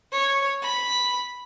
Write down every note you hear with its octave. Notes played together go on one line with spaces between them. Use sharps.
C#5
B5